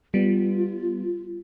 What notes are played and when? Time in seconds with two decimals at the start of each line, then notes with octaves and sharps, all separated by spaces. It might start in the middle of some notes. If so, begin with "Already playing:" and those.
0.14 G3 B3 F4